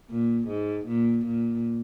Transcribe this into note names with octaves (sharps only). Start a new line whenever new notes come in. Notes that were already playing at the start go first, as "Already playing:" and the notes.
A#2
G#2
A#2
A#2